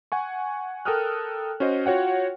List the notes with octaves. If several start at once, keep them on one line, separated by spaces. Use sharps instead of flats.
F#5 G#5 C#6
A4 A#4 G5 D#6 F6 F#6
C#4 F#4 C5 D#5
F4 F#4 C#5 F#5 G5